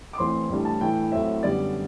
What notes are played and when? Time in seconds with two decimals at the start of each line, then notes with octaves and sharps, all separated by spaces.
0.13 D6
0.18 A1 A2 E3 A3 C4 C6
0.49 A2 E3 G3 D4
0.65 A5
0.80 A2 E3 A3 G5
1.12 A2 F#3 A3 C4 E5
1.43 F#2 D3 G3 B3 D5